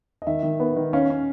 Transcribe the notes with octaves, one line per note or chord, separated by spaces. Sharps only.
D#5
D#3 E5
D#3
B3
D#3
C#4 F5
C#4